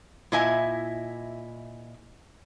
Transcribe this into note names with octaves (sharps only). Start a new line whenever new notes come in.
A#2 E4 D#5 E5 G#5